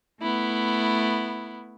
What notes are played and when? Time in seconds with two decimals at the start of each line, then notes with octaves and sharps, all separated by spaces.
0.20 A3 B3 E4